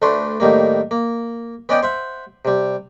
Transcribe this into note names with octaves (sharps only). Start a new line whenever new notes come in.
D2 A3 D4 B4 C6 C#6
A2 D#3 G3 A#3
A#3
B3 C#4 D5 D#5 F#5 G5
C5 E5 F#5
C3 G3